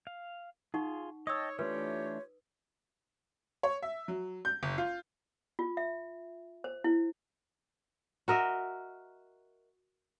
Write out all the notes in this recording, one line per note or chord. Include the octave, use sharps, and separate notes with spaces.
F5
D#4 F4 G#4 F#5 C#6
C#5 D#5 G5 A5 D#6 E6
E3 A3 D4 F4 G4 B4 C#5
C#5
E5
F#3
G6
F#1
F4
F4
E5
C5
E4
F#4 A#4 D#5 E5